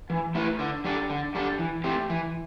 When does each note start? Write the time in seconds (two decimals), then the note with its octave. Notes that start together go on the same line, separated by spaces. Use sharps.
0.10 E3
0.35 A3 E4 B4
0.59 D3
0.84 G3 D4 A4
1.10 D3
1.35 G3 D4 A4
1.59 E3
1.84 A3 C4 G4
2.10 E3